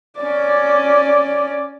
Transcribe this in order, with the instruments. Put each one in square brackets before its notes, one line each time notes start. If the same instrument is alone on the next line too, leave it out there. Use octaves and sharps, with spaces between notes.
[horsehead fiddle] C#4 D5